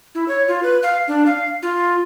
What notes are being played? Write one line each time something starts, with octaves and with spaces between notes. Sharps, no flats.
E4
C#5
F4
B4
F5
D4
F5
F4